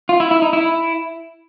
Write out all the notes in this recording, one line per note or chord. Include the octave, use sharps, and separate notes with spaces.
F4
E4
E4
D#4
E4